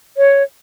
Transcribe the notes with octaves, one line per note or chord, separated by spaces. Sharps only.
C#5